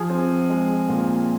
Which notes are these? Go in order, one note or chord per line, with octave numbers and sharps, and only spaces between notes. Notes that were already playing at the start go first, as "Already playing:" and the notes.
Already playing: F3 G#4
C4
G#3
A#2